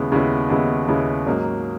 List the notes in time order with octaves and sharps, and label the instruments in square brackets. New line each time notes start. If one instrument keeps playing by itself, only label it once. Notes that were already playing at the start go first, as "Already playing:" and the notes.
Already playing: [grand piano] D#2 C#3 G#3 B3 E4
D#2 C#3 G#3 B3 E4
D#2 C#3 G#3 B3 E4
D#2 C#3 G#3 B3 E4
G#2 F#3 A#3 C#4